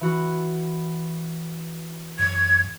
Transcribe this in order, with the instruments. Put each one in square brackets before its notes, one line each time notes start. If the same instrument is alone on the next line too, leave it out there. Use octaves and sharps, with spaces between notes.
[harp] E3 F#4
[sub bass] F#2 [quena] G#6